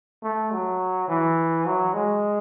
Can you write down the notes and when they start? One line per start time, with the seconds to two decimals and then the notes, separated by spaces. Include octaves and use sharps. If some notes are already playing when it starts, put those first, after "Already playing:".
0.23 A3
0.51 F#3
1.08 E3
1.66 F#3
1.94 G#3